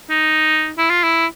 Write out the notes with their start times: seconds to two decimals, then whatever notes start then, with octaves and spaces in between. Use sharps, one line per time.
0.10 D#4
0.78 E4
0.90 F4
1.03 E4